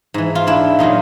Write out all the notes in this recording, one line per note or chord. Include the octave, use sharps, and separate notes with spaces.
G#2 E3
F4
D4 E4
A#2 F#3 D#4 F4